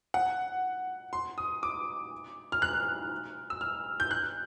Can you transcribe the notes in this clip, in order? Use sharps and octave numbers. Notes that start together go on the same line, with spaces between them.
F#5
C6
D#6
D6
F6
F#6
E6
F6
G6
F#6